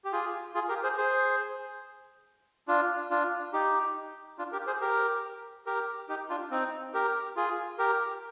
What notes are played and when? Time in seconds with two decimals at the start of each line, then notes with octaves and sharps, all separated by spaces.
0.05 G4
0.12 F4 G#4
0.54 F4 G#4
0.69 G4 A#4
0.83 G#4 C5
0.97 G#4 C5
2.68 D4 F4
3.10 D4 F4
3.53 D#4 G4
4.39 D4 F4
4.52 G4 A#4
4.67 G#4 C5
4.81 G4 A#4
5.66 G4 A#4
6.09 D#4 G4
6.30 D4 F4
6.51 C4 D#4
6.94 G4 A#4
7.36 F4 G#4
7.78 G4 A#4